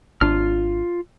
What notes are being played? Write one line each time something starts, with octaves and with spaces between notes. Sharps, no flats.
G#1 D4 F4 F6